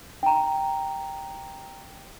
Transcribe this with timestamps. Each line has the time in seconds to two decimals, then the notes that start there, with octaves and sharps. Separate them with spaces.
0.23 G5 A#5